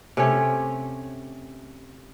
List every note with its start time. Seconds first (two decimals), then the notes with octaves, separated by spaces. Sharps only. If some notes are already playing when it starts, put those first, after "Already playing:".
0.17 C3 A3 C#4 C#5